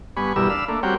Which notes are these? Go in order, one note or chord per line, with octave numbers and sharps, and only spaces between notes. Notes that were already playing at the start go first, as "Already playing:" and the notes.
G2 B3 G#5 B5 C#6
E2 G2 B2 G3 A#4 E6
D4 F5 B5 E6
A3 A#3 D4
G3 C4 F#4 A#4 C#5 G5